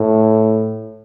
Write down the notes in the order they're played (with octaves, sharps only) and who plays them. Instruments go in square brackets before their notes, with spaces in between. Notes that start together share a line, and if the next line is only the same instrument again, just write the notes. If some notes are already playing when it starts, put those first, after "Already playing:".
Already playing: [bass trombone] A2